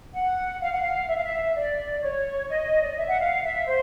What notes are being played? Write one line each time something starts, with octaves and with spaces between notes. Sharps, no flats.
F#5
F5
F#5
F5
E5
F5
E5
D5
C#5
D#5
D5
D#5
E5
F#5
F5
E5
C5